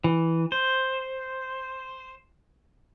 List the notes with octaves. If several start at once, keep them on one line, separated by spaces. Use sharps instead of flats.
E3
C5